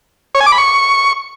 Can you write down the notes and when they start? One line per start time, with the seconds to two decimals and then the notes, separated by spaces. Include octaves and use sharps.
0.35 C#5
0.40 G#5
0.46 D6
0.52 B5
0.58 C#6